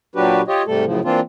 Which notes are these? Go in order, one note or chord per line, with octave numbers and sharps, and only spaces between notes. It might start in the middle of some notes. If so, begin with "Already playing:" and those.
A#2 F#3 D4 F#4 G4 B4
F4 G4 C#5 D#5
G#2 C3 G3 A3 A4
F#2 A2 C#3 F3
E3 A#3 C4 D4 F4